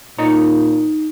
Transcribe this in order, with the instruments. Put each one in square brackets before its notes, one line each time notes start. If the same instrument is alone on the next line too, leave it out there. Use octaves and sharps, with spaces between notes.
[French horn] A#2 [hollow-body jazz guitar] D#4 C#5 A#5